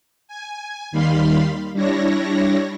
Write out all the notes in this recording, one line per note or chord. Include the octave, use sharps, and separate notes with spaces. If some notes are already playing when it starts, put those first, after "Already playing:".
G#5
D#2 D#3 G3 F5 B5 C6
G3 D4 E4 C#5 A#6